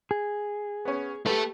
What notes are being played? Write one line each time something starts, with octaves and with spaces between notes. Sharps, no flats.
G#4
B3 C#4
A3 G4 A4 B4